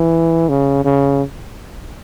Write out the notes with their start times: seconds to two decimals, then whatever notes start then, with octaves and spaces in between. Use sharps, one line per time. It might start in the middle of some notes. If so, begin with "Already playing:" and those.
Already playing: E3
0.49 C#3
0.85 C#3